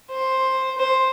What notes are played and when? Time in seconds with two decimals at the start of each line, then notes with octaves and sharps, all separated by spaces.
0.11 C5
0.78 C5